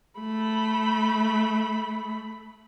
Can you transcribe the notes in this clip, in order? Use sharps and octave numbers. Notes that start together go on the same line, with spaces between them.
A3 B5